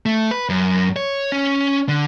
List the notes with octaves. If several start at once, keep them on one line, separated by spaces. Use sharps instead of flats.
A3
B4
F#2
C#5
C#4
D3